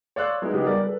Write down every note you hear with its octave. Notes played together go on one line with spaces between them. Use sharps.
C#5 D5 F5 C6 E6 F#6
F#3 G#3 B3 D#4 E4
C#3 F#3 B3 D#4 G4 G#4
G3 A#4 D5
A4 B4